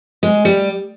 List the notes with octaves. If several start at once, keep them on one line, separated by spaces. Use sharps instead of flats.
G#3
G3